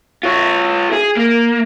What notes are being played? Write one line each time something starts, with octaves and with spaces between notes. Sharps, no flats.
F4 C#5
G#4
A#3